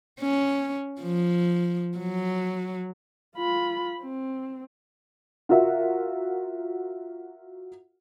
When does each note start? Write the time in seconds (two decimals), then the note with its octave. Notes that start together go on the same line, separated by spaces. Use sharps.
0.21 C#4
1.01 F3
1.98 F#3
3.36 F4 B5
4.01 C4
5.49 F4 F#4 A#4 E5 F#5